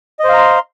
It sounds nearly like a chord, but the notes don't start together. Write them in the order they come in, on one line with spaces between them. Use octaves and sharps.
D#5 C5 F5 A#5 C6